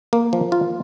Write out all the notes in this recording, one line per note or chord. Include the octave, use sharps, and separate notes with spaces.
A#3
F3
F4